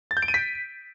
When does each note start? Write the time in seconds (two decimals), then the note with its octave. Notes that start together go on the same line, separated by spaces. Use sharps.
0.11 A6
0.17 G6
0.22 D7
0.28 D#7
0.34 B6